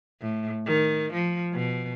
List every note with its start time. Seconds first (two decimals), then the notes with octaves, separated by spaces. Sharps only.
0.21 A2
0.66 D#3
1.13 F3
1.53 B2